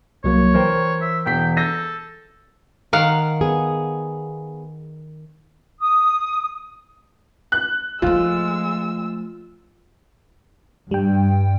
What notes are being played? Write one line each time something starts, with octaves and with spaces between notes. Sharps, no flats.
C2 F#3 A#3 C#5
E3 A#4 C5 G5
E5
E1 G5 B6
A4 G6 A#6 D#7
D#3 F5 F#5
B3 G#4
D#6
F#6
F3 G#3 A3 F4 E6
G2 G3 G5